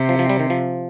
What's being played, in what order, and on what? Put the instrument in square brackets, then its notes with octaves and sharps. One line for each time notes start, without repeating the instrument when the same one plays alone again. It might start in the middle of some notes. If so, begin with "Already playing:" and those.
Already playing: [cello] C3
[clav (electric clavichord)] F3
F3
G3
D#3
F3